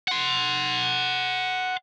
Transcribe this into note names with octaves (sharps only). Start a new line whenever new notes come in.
F#5 C6